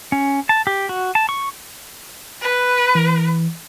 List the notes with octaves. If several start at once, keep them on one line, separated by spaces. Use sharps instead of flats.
C#4
A5
G4
F#4
A5
C#6
B4
E3